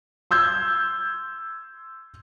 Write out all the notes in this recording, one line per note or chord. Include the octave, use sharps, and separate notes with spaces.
C6 E6 G6 G#6